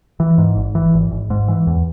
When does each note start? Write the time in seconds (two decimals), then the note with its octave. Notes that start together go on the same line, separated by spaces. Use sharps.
0.20 E3
0.38 G#2
0.57 G#1
0.75 E3
0.94 G#1
1.11 G#1
1.30 G#2
1.48 E3
1.67 E2